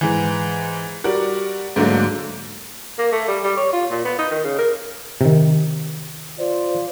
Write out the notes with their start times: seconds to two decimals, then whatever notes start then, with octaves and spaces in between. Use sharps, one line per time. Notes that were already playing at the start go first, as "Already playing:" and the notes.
0.01 G#2 E3
1.04 G3 F#4 A#4 D5
1.76 G#2 D3 F#3 A3 A#3
2.98 A#3
3.12 A3
3.28 G3
3.44 G3
3.57 C#5
3.72 F4
3.90 A#2
4.05 B3
4.18 D#4
4.31 D#3
4.44 C#3
4.58 A#4
5.21 C3 D#3
6.39 F4 C5 D5